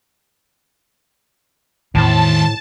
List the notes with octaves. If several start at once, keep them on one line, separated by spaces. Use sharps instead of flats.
E2 A2 D#3 C5 A5